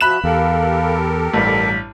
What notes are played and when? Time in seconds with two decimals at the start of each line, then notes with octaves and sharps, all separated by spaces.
0.01 F3 F#4 E5 B5 F#6 E7
0.24 E2 G4 A4 A#4 F5
1.34 A1 G2 B6